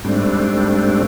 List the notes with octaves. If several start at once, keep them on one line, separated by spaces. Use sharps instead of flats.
G#2 G3 A3 C4 D4